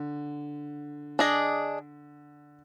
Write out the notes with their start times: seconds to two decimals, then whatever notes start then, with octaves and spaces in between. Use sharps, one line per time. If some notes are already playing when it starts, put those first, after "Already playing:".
Already playing: D3
1.19 D4 G#4 D#5